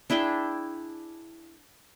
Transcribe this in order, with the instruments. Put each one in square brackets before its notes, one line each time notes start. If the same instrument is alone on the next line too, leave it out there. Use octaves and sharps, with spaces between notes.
[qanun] D4 E4 G#4 G5